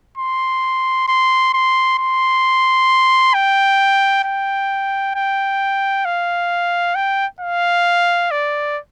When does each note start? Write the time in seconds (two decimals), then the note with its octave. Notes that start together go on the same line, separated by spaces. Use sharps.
0.17 C6
1.08 C6
1.54 C6
1.99 C6
3.34 G5
4.24 G5
5.15 G5
6.05 F5
6.95 G5
7.40 F5
8.31 D5